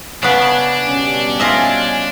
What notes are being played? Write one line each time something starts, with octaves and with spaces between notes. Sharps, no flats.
C#3 B3 D4 G#5
B2 G3 C#4
F4 D#5 E5 G#5